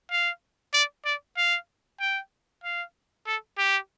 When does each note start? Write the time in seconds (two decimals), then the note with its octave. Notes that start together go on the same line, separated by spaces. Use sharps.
0.11 F5
0.73 D5
1.05 D5
1.37 F5
2.00 G5
2.64 F5
3.26 A4
3.57 G4